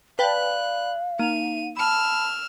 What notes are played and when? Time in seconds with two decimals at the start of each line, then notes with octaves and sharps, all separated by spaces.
0.19 B4 D5 F5 G5 A5 B5 F#6
1.19 A#3 D#4 D#7 F7
1.77 A5 B5 E6 F6